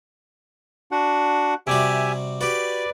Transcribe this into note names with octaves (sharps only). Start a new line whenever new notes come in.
D4 F#4 F#5
C3 G3 F#4 G4 E5 G#5
F#4 G4 B4 D5